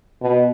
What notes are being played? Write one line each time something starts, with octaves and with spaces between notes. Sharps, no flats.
B2